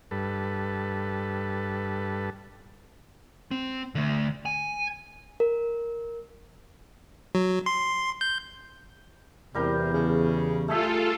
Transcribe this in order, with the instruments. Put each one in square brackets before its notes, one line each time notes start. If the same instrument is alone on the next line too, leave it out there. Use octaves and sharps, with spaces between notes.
[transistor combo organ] G2 A4 B4
[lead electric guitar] C4
D3 A3
G#5
[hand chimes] A#4
[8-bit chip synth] F#3
C6
G6
[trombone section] E2 [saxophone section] C3 [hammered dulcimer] G3 A#4 G5
[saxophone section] C#3
[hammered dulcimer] A3 G#4 E5 [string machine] F4 A4